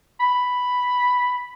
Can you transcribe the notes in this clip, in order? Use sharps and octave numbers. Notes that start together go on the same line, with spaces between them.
B5